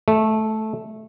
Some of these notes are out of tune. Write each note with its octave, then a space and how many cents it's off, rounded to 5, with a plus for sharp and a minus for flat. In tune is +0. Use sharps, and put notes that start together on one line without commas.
A3 -10